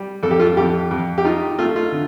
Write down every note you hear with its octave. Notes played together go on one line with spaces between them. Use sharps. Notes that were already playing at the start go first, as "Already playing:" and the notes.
Already playing: G3
F2 A4
G4
F4 A4
F2 G4
F2
G4
D#4 F4
A3 F4
F4
D3